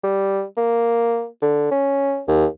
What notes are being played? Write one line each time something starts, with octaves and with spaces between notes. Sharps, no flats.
G3
A#3
D3
C#4
D#2